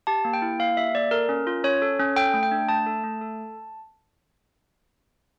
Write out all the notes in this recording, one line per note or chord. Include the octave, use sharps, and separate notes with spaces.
G4 A5
A#3
G5
E4
A#3 F5
G4 E5
A#3 D5
A4 A#4
C#4
F4
C#4 C#5
A4
C#4
A4 G5
A3
G5
D4
A3 A5
A4
A3
A4